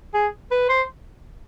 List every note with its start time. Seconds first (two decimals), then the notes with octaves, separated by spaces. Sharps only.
0.14 G#4
0.51 B4
0.69 C5